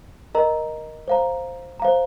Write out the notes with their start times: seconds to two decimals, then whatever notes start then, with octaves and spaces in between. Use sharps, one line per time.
0.35 A#4 D#5 A#5
1.08 C5 F5 A#5
1.80 C5 F5 A#5